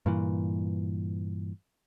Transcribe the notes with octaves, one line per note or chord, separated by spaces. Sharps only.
G2 A#2 E3